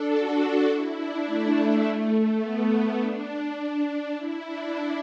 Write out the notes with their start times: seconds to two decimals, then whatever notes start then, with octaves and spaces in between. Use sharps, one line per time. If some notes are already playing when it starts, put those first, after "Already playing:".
Already playing: D4 A4
0.11 F#4
0.69 E4
0.97 D4
1.26 A3
2.41 B3
2.70 B3
3.00 D4
4.15 E4
4.44 D4